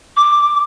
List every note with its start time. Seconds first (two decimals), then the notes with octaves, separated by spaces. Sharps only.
0.17 D6